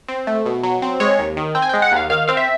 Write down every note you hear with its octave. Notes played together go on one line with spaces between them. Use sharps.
C4
A3
B2
F#3
C4
G#3 C#5
D#2
D#3
C4 G5
G#5
G#3 G5
F#5
D#2 F5
D#3 F5
C4 F5
E5